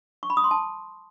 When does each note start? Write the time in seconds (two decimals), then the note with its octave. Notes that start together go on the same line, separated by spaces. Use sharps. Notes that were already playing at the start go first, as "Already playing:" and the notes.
0.23 C#6
0.30 B5
0.37 D#6
0.44 C6
0.51 A5